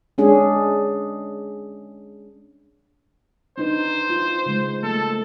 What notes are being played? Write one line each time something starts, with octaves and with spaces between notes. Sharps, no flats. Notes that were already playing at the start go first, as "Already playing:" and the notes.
G#3 C#4 D4 G#4
D4 D#4 B4 C5
F4
C#3 G#3
A3 A#3 A4